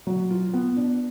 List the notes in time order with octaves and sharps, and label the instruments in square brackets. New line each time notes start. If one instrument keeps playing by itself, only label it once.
[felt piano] F#3
F4
B3
D4